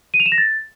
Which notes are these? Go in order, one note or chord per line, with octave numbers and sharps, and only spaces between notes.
D#7
F7
E7
A#6
A6